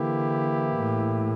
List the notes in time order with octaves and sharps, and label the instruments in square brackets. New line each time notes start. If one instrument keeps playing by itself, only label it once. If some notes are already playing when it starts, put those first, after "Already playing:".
Already playing: [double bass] D3 [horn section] E3 A#3 E4 G4
[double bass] A2